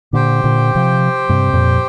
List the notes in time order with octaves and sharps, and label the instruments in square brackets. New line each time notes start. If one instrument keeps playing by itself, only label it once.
[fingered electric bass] A#2 D3 [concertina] G4 C5 G5
[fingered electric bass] A#2 D3
C3 F3
G2 C3
F2 A#2